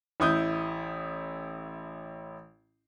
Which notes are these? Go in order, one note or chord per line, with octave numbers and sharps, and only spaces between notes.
A1 E4 D#6 G6